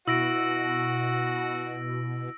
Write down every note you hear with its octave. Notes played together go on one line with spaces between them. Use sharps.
B2 E4 F#4 E6 A#6 D7